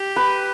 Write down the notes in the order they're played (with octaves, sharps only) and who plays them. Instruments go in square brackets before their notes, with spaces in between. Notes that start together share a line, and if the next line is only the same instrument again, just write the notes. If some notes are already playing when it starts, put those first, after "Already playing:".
Already playing: [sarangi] G4
[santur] B4